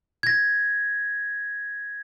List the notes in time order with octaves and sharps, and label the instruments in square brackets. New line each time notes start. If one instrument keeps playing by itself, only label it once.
[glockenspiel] G#6 A#6